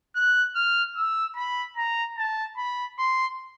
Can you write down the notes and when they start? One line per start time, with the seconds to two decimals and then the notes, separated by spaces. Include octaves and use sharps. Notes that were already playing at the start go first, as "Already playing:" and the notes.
0.15 F#6
0.55 F6
0.97 E6
1.36 B5
1.77 A#5
2.18 A5
2.57 B5
2.98 C6